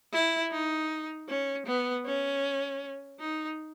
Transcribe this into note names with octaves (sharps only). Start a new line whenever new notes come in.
E4
D#4
C#4
B3
C#4
D#4